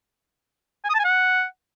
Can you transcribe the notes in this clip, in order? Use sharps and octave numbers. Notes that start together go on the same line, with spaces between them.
G#5
D#6
A5
G#5
F#5